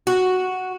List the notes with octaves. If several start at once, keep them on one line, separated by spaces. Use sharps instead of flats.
F#4